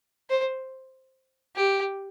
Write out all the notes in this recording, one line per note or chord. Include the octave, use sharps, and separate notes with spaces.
C5
G4